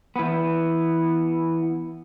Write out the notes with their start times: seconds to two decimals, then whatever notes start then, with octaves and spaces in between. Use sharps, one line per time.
0.16 E3 B3